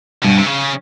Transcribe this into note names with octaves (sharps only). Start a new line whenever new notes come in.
G2 B2
C3
C#3